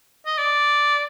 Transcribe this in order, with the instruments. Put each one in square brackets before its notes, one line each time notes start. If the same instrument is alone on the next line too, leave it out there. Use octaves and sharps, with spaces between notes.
[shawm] D#5
D5